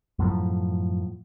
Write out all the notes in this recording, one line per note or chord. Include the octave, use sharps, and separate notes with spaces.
F#2 A2 F3